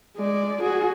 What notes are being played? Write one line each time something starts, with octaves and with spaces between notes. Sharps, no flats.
G#3 D5
F#4 G#4